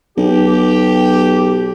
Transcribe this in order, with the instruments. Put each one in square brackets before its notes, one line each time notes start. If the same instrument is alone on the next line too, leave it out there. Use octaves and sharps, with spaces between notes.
[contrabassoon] B1 [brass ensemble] G4